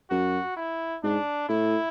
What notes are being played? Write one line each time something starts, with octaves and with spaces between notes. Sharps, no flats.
F#2 F#4
E4
G#2 D4
A2 E4